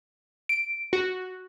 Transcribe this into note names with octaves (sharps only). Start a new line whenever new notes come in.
D7
F#4